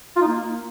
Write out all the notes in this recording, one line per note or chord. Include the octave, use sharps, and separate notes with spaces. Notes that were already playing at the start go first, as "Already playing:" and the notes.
F4
D#4
A#3